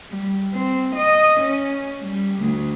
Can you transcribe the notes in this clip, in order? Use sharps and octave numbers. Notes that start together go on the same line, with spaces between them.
G3
C4
D#5
C#4
G3
D2